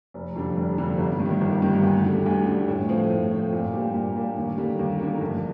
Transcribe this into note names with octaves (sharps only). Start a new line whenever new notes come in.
F1
F2 D3 G3 D4
F1
F2 D3 G3 D4
G1
G2
D#3
G1
G2 D#3
D2
D3 G3
D2
D3 G3
A2
F3 A3 C4
A2
F3 A3 C4
A#2
G3 A#3 D4 G4
A#2
G3 A#3 D4 G4
D#2
D3 G3 A#3
D#2
D3 G3 A#3
A#1